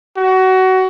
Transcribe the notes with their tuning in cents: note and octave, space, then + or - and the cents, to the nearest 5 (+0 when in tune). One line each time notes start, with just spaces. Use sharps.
F#4 +20